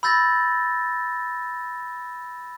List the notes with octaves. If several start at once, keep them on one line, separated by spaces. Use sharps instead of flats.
B5 E6 G6 A6 A#6